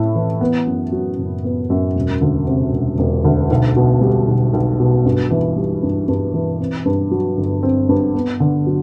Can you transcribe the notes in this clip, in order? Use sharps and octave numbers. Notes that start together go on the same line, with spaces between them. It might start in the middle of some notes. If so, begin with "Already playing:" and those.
Already playing: A2 E4
E3
B3
F#2
F#3
F#1
B3
F#2
E1
D2
C3
E1
E1
D2
B1
B2
G3
B1
B1
B2
G2
E3
G3
G2
G2
E3
C4
G2
F#3
G1
C4
G2
B3
D3
F#3